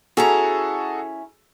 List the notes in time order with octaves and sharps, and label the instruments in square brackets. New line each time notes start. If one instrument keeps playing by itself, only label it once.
[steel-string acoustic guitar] C#4 E4 A#5 [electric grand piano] F#4 G#4 A4